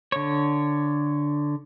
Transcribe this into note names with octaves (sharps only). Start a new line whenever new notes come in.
D3 C#5